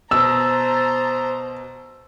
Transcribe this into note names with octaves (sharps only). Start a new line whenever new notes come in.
B2 C5 A5 A#5 E6